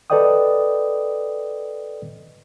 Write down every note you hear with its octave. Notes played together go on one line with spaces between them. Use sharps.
A4 B4 D5 D#5 G5 D#6